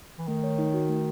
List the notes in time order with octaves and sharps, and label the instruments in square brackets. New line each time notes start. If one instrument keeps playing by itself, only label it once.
[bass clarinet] E3
[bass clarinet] D#3 [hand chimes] A3
[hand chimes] C#5
D#4
F#4
A3